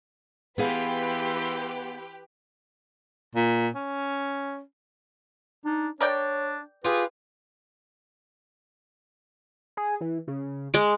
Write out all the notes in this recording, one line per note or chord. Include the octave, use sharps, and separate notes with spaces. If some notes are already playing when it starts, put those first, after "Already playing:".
E3 B3 G4 G#4 B4 F5 C6
A#2
C#4
D4 D#4
D4 A#4 C#5 D5 G5
F4 G4 G#4 B4
G#4
E3
C#3
G#3 D6